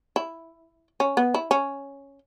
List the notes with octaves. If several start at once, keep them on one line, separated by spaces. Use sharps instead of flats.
E4
C#4
B3
E4
C#4